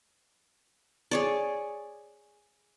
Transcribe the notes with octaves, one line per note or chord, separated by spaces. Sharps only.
G#4 C#5 D5